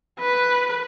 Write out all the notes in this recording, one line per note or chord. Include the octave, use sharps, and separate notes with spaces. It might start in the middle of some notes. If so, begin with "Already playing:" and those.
B4